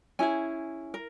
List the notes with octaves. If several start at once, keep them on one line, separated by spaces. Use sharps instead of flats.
C#4 E4 G#4 G#5
A#4